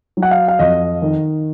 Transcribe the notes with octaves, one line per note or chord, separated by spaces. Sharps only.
F#3
F#5
F5
F5
F2 D#5
D#3